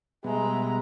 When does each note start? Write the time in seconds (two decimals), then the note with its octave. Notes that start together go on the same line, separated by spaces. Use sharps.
0.24 B2 G3 G#3 B3 E5 A#5